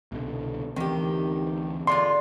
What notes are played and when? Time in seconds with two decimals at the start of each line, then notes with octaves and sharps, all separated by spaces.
0.12 C2 B2 D3
0.76 D2 D#3 E3 C4 G4
1.87 D3 G#3 F4 C6